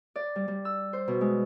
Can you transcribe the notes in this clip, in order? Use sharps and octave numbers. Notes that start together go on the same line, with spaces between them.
D5
G3
G3
E6
C5
B2
G#3